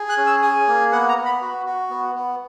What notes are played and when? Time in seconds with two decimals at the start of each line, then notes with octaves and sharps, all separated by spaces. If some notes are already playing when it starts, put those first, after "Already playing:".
Already playing: G#4
0.09 F#6
0.17 C#4
0.26 E6
0.42 G#4 D#6
0.68 A#3
0.92 B3 F#5
1.09 A#5
1.17 B3
1.25 B5
1.41 F#4
1.66 F#4
1.90 B3
2.15 B3